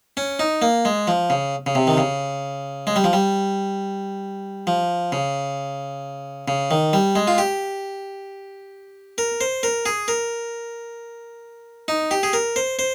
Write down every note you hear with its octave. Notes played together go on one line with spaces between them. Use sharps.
C#4
D#4
A#3
G#3
F3
C#3
C#3
C3
D#3
C#3
G#3
G3
F3
G3
F3
C#3
C#3
D#3
G3
G#3
F4
G4
A#4
C5
A#4
G#4
A#4
D#4
G4
G#4
A#4
C5
C5